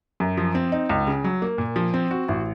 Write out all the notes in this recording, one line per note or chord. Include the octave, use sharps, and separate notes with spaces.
F#2
F3
C4
D#4
C#2
C#3
F#3
A#3
A#2
F3
C4
F#4
A1